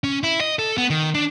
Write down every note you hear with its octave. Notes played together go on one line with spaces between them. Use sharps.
C#4
E4
D#5
A4
B3
D#3
D4